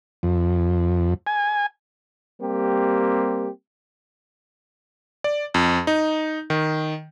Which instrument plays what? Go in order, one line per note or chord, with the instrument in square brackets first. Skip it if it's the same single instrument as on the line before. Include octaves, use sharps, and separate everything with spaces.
[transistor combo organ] F2
G#5
[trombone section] G3 A#3 C4 G4
[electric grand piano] D5
F2
D#4
D#3